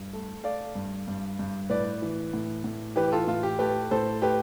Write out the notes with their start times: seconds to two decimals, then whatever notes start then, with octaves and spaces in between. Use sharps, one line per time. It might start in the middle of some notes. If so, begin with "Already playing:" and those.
Already playing: G2
0.13 A3
0.44 A3 D5 F5
0.75 G2
1.08 G2
1.39 G2
1.70 A2 B4 D5
2.02 E3
2.33 A2
2.64 A2
2.96 E3 G4 B4
3.12 F4 A4
3.27 A2 F4
3.43 G4
3.59 A3 G4 B4
3.91 A2 A4 C5
4.22 A3 G4 B4